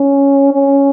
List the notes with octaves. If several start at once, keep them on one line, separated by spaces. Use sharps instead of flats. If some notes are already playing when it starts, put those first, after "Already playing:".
Already playing: C#4
C#4